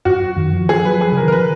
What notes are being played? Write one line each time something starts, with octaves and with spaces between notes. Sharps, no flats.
F#2 F#4
D#3
F3
G#4
F3
F#3 B4
F3 G#4
C#3
A#4
D#3
A#4
F3 B4